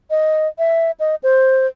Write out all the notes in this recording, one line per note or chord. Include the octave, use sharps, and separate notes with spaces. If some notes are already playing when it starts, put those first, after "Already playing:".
D#5
E5
D#5
C5